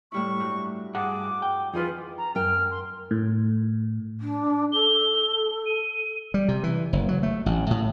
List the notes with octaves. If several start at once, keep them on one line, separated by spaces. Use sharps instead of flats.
A2 G3 E4 C#6
G2 F#3
G2 G#4 F#5 A5 D6
G5
F2 E3 D#4 F4 G#4 B4 D#5
A#5
F#2 G5 F6
C6
A2
D4
A4 G7
D#7
G3
C3
E3
F#1
F#3
A3
A1
A2